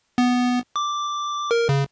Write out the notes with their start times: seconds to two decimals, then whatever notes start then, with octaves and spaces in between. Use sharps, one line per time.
0.18 B3
0.76 D6
1.51 A#4
1.69 C#3